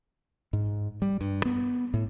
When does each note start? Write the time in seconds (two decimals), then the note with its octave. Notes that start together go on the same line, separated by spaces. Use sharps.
0.53 G#2
1.02 G3
1.21 G2
1.45 B3
1.94 A2